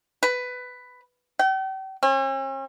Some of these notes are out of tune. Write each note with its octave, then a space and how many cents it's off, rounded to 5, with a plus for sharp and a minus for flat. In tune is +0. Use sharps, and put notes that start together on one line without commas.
B4 +10
G5 -40
C#4 -45